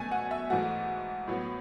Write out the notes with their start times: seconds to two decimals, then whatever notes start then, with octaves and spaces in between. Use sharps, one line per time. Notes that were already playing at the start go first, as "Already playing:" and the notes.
Already playing: B2 A3 G#5
0.11 F#5
0.31 E5
0.50 G#2 E3 A3 F#4
1.27 A2 F#3 B3